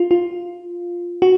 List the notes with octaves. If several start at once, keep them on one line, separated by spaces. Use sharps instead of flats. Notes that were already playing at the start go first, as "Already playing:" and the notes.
Already playing: F4
F4
F#4